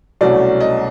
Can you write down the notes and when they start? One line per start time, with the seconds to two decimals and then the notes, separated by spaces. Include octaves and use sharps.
0.21 C2 B2 F#3 A3 C#4 D5
0.61 D#5